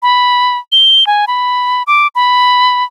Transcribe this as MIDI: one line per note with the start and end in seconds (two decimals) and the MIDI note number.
0.03 0.58 83
0.72 1.07 103
1.07 1.25 80
1.27 1.83 83
1.87 2.07 86
2.15 2.84 83